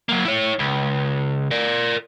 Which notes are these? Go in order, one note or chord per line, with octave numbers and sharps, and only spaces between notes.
F#3 A#3
E4 C#5
C#2
A#4 D5